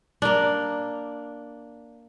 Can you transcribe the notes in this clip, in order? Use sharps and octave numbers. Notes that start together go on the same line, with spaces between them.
A#3 D4